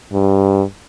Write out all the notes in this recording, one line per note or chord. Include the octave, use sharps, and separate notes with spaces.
G2